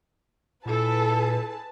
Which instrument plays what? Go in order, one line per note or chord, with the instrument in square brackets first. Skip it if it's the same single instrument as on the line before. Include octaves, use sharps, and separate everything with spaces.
[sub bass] A#2 [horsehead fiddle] E4 A4 [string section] G#4 B4 A5